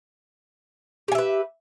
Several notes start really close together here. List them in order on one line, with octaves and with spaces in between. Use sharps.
G4 G#5 E5 B4